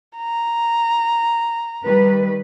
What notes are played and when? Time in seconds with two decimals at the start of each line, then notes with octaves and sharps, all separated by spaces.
0.17 A#5
1.84 D#3 G3 B4